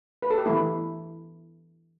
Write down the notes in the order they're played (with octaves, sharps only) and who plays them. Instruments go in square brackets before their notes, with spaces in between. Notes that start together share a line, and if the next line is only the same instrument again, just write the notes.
[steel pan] B4
A4
G4
E3 G3 B3 E4